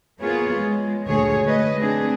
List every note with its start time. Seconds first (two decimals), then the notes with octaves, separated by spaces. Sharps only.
0.20 A#3 B3 F4 G#4 C#5
0.57 G#3
1.08 D2 A#2 G#4 C#5
1.44 A3 B4 D#5
1.76 A3 C4 D4 G#4